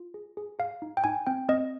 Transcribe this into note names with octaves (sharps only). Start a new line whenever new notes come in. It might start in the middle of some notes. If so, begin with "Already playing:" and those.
Already playing: F4
G#4
G#4
G#4 F5
D#4
G5
D#4 G#5
C4 G5
C4 D#5